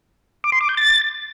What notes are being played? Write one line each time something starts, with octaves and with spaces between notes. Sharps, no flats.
D6
C6
D6
G6
A6